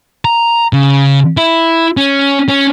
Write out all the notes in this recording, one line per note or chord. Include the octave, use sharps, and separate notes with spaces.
A#5
C#3
E4
C#4
C#4